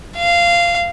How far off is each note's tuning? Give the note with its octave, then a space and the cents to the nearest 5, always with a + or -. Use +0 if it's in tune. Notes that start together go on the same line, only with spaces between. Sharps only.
F5 -15